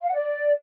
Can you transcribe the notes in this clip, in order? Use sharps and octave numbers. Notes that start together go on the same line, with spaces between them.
F5
F#5
D5